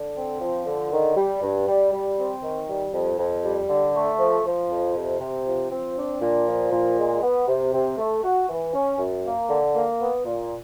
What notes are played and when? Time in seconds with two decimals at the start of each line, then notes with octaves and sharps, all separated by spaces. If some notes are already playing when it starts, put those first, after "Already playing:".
Already playing: D3
0.16 C4
0.41 F3
0.67 D3
0.92 D#3
1.17 G3
1.42 G2
1.67 G3
1.92 G3
2.18 C4
2.43 D#3
2.68 G3
2.94 F2
3.19 F2
3.44 G3
3.70 D3
3.95 A3
4.20 F3
4.45 F3
4.71 F2
4.96 C3
5.21 C3
5.46 F3
5.72 C4
5.97 D4
6.22 A#2
6.47 F3
6.72 A#2
6.97 G#3
7.23 B3
7.48 C3
7.74 C3
7.98 A3
8.24 F#4
8.49 E3
8.74 C#4
8.99 F#2
9.25 A#3
9.50 D3
9.75 A#3
10.01 B3
10.25 A#2